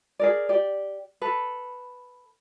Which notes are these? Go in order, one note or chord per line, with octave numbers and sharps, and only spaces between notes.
G#4 A#4 D5
G4 D5
A4 B4